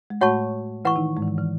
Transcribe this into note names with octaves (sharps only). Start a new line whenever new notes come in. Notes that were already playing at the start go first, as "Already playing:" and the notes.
G#3
A2 A3 F#4 C#5 F#5 A5 C#6
E3 E4 B4 F#5 C#6
D#3 D#4
G#2 G#3
E3
D#3
E3